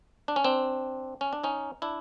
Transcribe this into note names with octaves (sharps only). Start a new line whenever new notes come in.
D4
C#4
C4 D4
C#4
D4
C#4 D#4
D4 E4